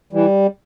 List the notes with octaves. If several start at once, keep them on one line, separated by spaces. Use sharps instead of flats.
E3 G3